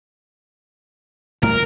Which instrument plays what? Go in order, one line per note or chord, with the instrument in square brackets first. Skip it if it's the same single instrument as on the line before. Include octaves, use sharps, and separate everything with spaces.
[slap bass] A2 G3 [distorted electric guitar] A#4